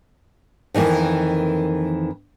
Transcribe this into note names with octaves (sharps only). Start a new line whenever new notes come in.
F2 D#3 E3 A#3